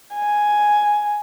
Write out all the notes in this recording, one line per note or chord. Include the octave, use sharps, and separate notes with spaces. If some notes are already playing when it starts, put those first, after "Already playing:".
G#5